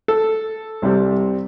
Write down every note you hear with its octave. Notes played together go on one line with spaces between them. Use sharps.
A4
C2 C3 G3 C4